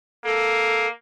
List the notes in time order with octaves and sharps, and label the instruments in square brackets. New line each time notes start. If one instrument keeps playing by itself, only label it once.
[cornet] A#3 [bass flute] A4